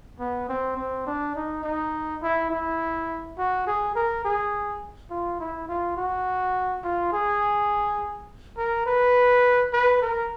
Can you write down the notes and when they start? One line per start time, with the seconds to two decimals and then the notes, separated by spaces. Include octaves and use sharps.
0.20 B3
0.49 C4
0.77 C4
1.07 D4
1.36 D#4
1.64 D#4
2.23 E4
2.50 E4
3.38 F#4
3.67 G#4
3.96 A#4
4.25 G#4
5.10 F4
5.40 E4
5.69 F4
5.97 F#4
6.84 F4
7.13 G#4
8.57 A#4
8.86 B4
9.73 B4
10.02 A#4